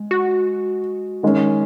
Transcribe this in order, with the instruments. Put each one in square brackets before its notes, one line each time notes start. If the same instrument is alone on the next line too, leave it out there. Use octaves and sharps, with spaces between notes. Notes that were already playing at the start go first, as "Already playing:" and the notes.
Already playing: [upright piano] G#3
[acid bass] F#4
[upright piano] D#3 G#3 C#4